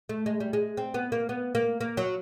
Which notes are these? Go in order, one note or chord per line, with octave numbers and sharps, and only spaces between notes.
A3
G#3
G3
G#3
C4
B3
A#3
B3
A#3
A#3
F#3